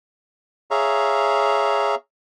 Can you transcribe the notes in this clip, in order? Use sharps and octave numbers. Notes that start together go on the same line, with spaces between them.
G#4 C#5 E5 F5 A#5